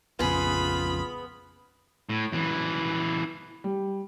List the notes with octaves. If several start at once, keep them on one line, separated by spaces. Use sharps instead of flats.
A#1 F2 C#3 B3 F4 G#4 B5
A2
F#2 E3
G3